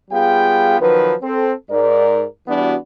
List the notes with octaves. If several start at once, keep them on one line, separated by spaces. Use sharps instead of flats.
G3 B3 F4 G#4 F5 G5
D#3 F3 F#3 B4
C4 A4
G#2 A#4 D5
E3 G3 B3 D4 F#4